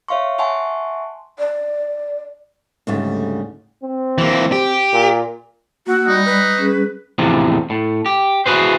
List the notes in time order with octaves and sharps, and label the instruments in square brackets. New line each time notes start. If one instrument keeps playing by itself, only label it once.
[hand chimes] C#5 E5 F5 C6 C#6
E5 F#5 G#5 A5 C6 C#6
[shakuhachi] D5
[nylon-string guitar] D2 G#2 C#3 G3 A3
[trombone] C4
[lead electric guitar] E3 A#3
G4
[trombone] A#2
[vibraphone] A#3 F#5 E6 [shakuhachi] F#4
[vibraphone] G3 D5 B5 [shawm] D#4
[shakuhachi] B4
[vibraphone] G3 C#4 G#4
[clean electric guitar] E2 A2 C3 F3
A2
G4
E4 F#4 G#4 B4 C5